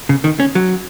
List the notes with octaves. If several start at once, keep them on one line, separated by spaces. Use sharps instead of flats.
C#3
D#3
C#4
F#3